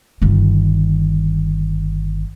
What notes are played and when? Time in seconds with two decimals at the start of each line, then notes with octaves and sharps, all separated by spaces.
0.22 G1 D#3